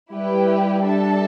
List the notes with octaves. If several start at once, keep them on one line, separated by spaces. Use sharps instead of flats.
G3 E4 G4 B4 G5
D4 A4 E5 A5